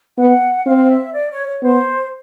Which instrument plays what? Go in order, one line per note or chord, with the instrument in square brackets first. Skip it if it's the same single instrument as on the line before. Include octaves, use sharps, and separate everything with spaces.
[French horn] B3 [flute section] F#5
[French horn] C4 [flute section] F5
[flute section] E5
D5
C#5
C#5
[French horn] B3 [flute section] C5